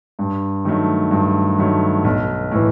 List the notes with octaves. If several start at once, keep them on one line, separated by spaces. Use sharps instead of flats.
G2
D#3 F#3 A3
G2
D#3 F#3 A3
B1
A2 E3